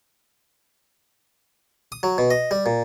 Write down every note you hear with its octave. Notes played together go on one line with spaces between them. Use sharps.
D#6
F#3
B2
D#5
G3
A#2